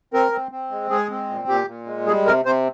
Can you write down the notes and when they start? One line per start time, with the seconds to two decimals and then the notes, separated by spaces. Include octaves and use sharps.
0.13 C4 A#4
0.32 C4
0.52 C4
0.71 G#3
0.90 G#3 G#4
1.10 C4
1.30 A#2
1.48 A#2 G4
1.67 A#2
1.87 G#3
2.06 G3 G#4
2.26 C3 A#4
2.45 C3 C5